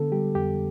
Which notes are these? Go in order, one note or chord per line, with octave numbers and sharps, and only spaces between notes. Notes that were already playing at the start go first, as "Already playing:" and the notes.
Already playing: D3 B3 A4
G3 G4
F2 G4